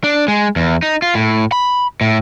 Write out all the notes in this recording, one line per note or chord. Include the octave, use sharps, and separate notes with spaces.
D4
G#3
E2
D#4
F4
A2
B5
A2